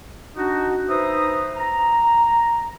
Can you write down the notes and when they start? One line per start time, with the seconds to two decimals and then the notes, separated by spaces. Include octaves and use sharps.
0.36 D4 D#4 F#4
0.89 D#4 B4 C5 E5 A#5 D#6
1.57 A#5